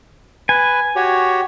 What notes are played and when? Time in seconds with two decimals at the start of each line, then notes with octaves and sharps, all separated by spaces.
0.49 B4 G#5
0.96 F#4 G4 C#5